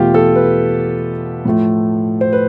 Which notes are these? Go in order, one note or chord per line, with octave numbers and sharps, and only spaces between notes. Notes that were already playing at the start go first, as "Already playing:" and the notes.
Already playing: E2 B2 A3 F4 G4
A4
B4
A2 F3 A3
C5
B4